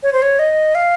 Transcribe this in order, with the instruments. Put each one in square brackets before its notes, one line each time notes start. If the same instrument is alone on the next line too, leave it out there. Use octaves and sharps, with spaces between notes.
[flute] C#5
C5
C#5
D#5
F5